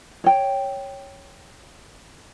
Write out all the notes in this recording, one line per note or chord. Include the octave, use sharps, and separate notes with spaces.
C#5 G5